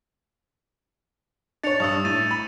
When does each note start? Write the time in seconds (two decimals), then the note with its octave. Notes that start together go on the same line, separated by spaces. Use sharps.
1.63 D4 C#5 A6 C#7 F7
1.80 G2 D4 C#6 D#6 E6
2.05 A2 A6 D#7
2.31 B5 D#7